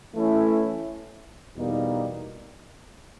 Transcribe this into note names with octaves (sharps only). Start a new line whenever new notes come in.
E3 A3 C#4 E4
E2 B2 G3 A#3 D#4